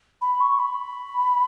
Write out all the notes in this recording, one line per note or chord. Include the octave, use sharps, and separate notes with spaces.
B5
C#6
B5